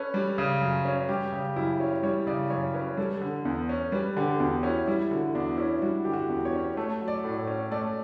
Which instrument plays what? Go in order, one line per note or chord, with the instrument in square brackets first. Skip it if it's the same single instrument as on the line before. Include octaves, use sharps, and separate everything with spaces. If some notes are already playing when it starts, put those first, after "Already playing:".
Already playing: [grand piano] C#4 [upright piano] A4 B4
[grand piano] G3
C#3
F#2
C#4
[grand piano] G3 [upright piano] G4
[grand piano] C#3
[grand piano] F#2 [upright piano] E4
[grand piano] C#4
[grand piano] G3 [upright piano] C#5
[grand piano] C#3 [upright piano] D5
[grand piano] F#2 [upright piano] C#5
[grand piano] C#4 [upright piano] B4
[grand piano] G3 [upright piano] A4
[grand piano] D3
E2
C#4
[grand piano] G3 [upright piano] B4
[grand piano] D3 [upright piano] G4
[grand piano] E2 [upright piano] F#4
[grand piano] C#4 [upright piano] E4
[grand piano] G3 [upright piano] E4
[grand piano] D3 [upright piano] F#4
[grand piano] E2 [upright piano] D4
[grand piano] C#4 [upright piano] E4
[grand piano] G3 [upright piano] F#4
[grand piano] D3 [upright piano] G4
[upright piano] F#4
[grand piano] E2
[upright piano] C#5
[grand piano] C#4
[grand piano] A3 [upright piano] C#5
[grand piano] F#3
[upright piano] D5
[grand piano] A2
[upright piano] C#5
[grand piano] C#4
[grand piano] A3 [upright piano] D5